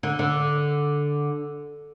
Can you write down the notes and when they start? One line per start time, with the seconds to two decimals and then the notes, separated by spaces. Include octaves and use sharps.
0.03 D3
0.19 D3